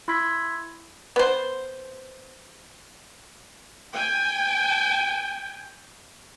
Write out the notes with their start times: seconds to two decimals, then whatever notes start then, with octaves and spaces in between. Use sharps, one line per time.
0.08 E4 B5 C6 E6 G#6 B6
1.16 B3 C5
3.94 G5 G#5